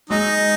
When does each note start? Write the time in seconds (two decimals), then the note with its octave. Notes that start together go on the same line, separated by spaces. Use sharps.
0.09 F#3 G#3 D#4